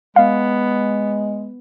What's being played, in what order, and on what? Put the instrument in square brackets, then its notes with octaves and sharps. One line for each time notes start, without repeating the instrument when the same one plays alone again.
[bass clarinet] G#3 [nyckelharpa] B3 [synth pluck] F5